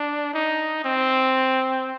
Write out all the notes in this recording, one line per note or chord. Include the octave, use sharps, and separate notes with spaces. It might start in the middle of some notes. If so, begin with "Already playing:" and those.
Already playing: D4
D#4
C4